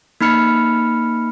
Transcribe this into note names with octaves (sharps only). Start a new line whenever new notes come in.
A#3 D#4 B5 F6 C#7